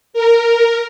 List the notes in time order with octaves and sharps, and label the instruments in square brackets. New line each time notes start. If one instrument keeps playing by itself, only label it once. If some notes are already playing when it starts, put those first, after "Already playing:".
[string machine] A#4